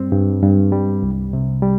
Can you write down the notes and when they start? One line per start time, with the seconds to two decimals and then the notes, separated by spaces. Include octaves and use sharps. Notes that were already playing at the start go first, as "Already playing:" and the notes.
Already playing: G2 G3 C4
0.12 G2
0.43 G2
0.72 G3
1.02 C2
1.33 C3
1.62 G3